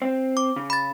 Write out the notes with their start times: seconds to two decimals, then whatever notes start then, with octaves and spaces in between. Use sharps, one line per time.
0.02 C4 C5
0.37 D6
0.56 C#3
0.70 B5 A6